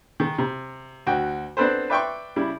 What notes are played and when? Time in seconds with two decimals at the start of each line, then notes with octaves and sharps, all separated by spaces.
0.20 D#3 G#3
0.38 C3
1.07 D2 F#4 G5
1.57 B3 C4 D4 A4 B4 C5
1.90 B4 D5 E5 G5 C6 C#6
2.36 C#3 G3 E4